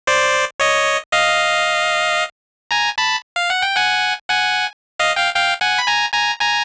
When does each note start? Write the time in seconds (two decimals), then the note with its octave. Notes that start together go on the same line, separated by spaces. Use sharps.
0.07 C5 D5
0.60 C#5 D#5
1.13 D#5 F5
2.71 G#5 A#5
2.98 A5 B5
3.36 F5
3.50 F#5
3.62 G5
3.76 F#5 G#5
4.28 F#5 G#5
5.00 D#5 F5
5.16 F5 G5
5.35 F5 G5
5.61 F#5 G#5
5.78 B5
5.87 G#5 A#5
6.13 G#5 A#5
6.40 G#5 A#5